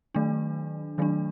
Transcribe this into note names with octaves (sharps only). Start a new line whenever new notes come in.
D#3 F#3 A3 D4
D#3 F#3 A3 D4